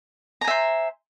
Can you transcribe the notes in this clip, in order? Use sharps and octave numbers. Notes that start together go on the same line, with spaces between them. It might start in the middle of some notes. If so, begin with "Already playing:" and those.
C5 E5 G#5 A#5